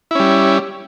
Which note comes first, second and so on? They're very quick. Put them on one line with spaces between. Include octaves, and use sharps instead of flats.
E4 C#4 G3